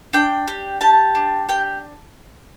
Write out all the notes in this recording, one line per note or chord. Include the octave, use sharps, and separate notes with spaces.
D4 G5
G4
G4 A5
D4
G4 G5